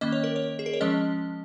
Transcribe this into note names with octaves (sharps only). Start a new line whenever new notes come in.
D#3 A#3 C#4 D#5
C#5
A#4
C#5
G#4
A#4
C#5
F3 G#3 C#4 D#5